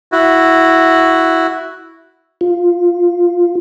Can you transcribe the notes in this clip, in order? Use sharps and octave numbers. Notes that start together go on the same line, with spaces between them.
E4 F#4
F4